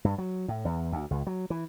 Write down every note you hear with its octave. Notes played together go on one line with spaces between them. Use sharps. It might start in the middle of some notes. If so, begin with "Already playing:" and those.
G2
F#3
A2
E2
D2
C#2
F#3
E3